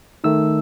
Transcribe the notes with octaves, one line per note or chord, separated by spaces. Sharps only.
D#3 A3 D#4 E6